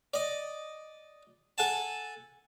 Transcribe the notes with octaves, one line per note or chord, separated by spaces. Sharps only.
D5 D#5
A4 F#5 G#5 A5